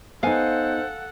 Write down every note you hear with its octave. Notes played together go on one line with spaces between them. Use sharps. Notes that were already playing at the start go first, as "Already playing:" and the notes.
B3 D#4 A4 C5 F5 F#5 G#5